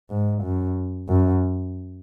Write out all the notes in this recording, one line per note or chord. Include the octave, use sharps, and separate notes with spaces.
G#2
F#2
F#2